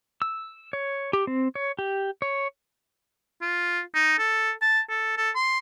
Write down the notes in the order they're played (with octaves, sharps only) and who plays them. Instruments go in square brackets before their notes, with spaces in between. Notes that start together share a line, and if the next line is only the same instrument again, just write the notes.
[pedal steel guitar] E6
C#5
G4
C4
C#5
G4
C#5
[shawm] F4
D#4
A4
A5
A4
A4
C6